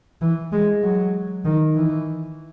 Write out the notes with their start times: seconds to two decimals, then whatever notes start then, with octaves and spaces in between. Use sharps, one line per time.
0.21 E3
0.52 G#3
0.84 F#3
1.45 D#3
1.76 E3